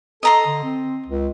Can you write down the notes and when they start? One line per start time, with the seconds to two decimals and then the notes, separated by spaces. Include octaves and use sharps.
0.23 A4 D#5 A#5 C6
0.47 D3
0.64 C4
1.07 C#2